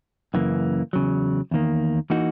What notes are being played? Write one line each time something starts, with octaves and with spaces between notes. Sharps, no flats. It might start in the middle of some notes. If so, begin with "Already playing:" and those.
F#2 C#3 E3 A#3
E2 C#3 F#3
E2 D#3 A#3
E3 A#3 D#4 F#4